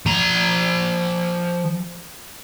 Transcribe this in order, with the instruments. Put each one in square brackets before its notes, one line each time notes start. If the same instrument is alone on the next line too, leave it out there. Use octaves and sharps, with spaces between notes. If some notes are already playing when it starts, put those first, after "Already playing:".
[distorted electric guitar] F3 A#5